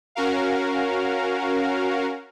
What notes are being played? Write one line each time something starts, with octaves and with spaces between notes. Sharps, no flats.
C#4 F#4 A#4 F5